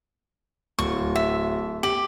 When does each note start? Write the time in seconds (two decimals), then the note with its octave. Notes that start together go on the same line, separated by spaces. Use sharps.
0.79 D1 C#6
1.16 E5
1.83 G4 F#7